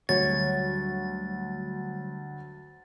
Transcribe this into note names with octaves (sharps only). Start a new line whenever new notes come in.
D2 F#3 G3 C#5 A6